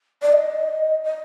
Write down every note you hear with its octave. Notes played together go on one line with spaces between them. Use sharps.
D5
D#5
D#5